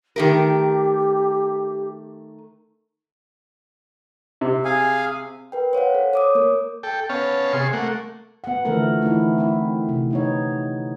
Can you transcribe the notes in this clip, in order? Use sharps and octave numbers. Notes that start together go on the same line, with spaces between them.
D#3 A3 G4 A#4
C3
G#4 F5 G#5
A#4 B4 G5
C5 C#5 F5 F#5
A4
C#5 D6 D#6
A#3 A#4
A4 G5
B3 C#4 C#5 F5 A5
C3 G#4 C6 C#6
A3 A#3 F#5
B3 F#5
D3 E3 F3 A3 A4 A#4
E3 A3 C4 D#4 E4
C4 E4
C3
B3 D#4 C#5